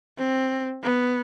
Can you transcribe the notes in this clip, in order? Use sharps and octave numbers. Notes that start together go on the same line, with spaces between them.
C4
B3